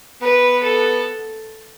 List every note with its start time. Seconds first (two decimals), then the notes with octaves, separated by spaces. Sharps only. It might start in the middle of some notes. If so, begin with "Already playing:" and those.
0.21 B3 B4
0.63 A4